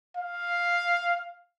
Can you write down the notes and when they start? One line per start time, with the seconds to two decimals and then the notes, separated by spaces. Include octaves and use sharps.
0.17 F5